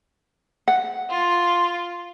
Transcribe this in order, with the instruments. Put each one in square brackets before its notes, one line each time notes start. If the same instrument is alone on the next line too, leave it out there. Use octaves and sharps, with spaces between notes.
[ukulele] F#5
[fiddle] F4